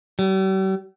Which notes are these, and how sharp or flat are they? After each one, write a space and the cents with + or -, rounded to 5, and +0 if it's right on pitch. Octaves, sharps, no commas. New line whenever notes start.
G3 -45